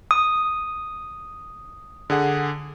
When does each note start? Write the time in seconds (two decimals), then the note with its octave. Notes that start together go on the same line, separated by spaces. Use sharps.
0.11 D#6
2.10 D3 G#4 F#5